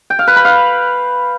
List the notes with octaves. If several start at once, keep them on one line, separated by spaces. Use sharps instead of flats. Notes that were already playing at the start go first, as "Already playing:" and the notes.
G5
F5
B4
B5
F5